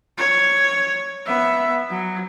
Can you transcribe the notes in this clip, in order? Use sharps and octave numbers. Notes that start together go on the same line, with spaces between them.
C#5
B3 E5
F#3